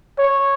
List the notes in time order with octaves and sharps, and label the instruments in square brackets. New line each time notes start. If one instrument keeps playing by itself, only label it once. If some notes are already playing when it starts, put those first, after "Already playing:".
[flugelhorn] C#5